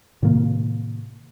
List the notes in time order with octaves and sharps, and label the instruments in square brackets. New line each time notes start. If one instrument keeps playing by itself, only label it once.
[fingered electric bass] A2 C3 D#3 A#3